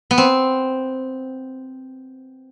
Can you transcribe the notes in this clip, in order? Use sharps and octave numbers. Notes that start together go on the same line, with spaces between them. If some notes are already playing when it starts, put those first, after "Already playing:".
B3
C4